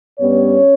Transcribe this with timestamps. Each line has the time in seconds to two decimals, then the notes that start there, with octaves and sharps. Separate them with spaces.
0.20 G2 G3 B3 C#4 C#5